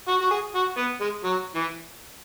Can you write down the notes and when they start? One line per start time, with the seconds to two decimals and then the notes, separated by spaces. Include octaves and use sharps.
0.08 F#4
0.21 F#4
0.31 G#4
0.55 F#4
0.77 B3
1.01 G#3
1.24 F#3
1.55 E3